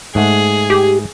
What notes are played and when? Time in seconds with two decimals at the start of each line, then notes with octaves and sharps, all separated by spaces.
0.15 G#2 A3 G#4 F#5
0.70 G4